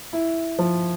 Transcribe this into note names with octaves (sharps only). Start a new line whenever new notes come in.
E4
F3